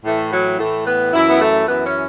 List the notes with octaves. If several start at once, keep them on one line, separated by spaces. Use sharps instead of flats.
A2 E3 A3
F#3
A2 E3 A3
B3
F#2 E3 E4
B3
A3
F#2 E3 B3
C#4